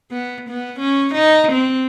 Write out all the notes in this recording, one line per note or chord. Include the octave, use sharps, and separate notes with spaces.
B3
B3
C#4
D#4
C4